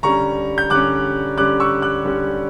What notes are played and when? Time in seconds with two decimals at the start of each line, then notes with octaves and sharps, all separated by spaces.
0.03 D3 G3 C#4 A#5 C#6
0.58 G6
0.70 D3 G3 C#4 D6 F#6
1.38 D3 G3 C#4 D6 F#6
1.60 C#6 E6
1.82 D6 F#6
2.05 D3 G3 C#4